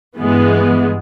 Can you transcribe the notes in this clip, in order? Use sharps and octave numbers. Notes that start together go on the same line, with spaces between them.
G2 E3 G#3 B3